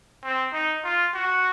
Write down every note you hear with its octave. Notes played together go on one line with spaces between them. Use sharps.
C4
D#4
F4
F#4